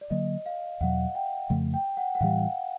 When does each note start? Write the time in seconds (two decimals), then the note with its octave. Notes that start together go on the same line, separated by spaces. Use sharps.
0.01 D5
0.10 D3 F#3 A#3 D#5
0.46 F5
0.81 E2 B2 F#3 F#5
1.15 G5
1.50 F2 C#3 F3 A3
1.74 G5
1.97 F#5
2.15 F#5
2.20 A2 E3 G3 F5